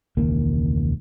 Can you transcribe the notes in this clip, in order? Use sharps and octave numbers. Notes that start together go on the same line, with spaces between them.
E1 C#2 D#3 A#3